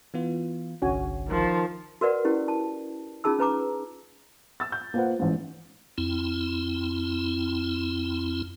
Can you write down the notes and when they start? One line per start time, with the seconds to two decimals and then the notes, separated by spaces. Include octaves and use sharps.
0.14 E3 B3 F4
0.82 G1 C2 D3 C#4 F#4 G#5
1.28 D#3 F3
2.01 F#4 A#4 B4 D5 F#5
2.25 C#4 E4 G4
2.48 A5
3.24 C#4 D#4 F4 G#4 A5 E6
3.39 C#4 B4 A#5 D6
4.60 E6 A6
4.72 G6
4.94 A#3 F4 B4 C5 F#5
5.19 A1 G#2
5.98 F2 C4 E4